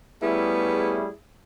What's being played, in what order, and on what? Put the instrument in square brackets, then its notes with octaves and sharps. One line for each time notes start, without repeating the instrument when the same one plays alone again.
[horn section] G3 A3 C#4 [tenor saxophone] B3 [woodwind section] E4 G#4